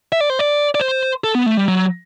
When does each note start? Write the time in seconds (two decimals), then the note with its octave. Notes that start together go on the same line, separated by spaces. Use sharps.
0.12 E5
0.21 D5
0.30 C5
0.39 D5
0.75 D5
0.80 C5
1.24 A4
1.35 B3
1.46 A3
1.57 G3
1.68 F#3